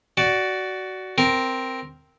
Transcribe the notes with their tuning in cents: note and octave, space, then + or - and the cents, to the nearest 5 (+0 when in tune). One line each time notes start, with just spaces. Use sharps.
F#4 +15 D5 -5
C4 +0 A#4 +0